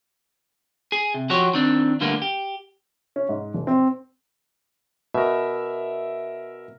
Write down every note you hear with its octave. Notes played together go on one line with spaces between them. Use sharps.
G#4
C3
F3 F#4 G4 C#5
D#3 C4 D4
D2 G2 D3 G3 A#3 B3
G4
C#4
G#2
E1
C4
B2 A#4 E5